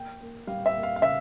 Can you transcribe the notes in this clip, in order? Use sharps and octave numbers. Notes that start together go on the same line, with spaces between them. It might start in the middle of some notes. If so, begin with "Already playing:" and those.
Already playing: A#3 G5
A#3
G3 F5
E5
A#3
F5
F5
C#3 E5